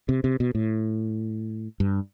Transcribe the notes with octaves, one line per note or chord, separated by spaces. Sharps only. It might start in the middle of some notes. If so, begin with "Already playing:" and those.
C3
C3
B2
A2
G2